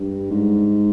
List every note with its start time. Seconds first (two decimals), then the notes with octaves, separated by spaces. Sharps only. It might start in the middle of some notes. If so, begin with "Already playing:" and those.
Already playing: G2
0.31 G#2